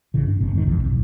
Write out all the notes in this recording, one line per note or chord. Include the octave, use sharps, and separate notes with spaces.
A1 C#3 E3
G2 D4
G1 C3
F2 G#2 B2 D#3
B1 F2 C3 E3
D1 B1